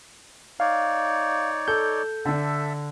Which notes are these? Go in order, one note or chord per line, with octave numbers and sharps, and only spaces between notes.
D#4 C#5 D5 F5
A4 G6
D3 D4 A4 E5